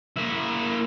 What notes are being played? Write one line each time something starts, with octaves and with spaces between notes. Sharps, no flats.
A#3 E4